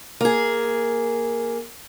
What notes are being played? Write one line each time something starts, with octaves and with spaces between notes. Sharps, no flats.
A#3 G#4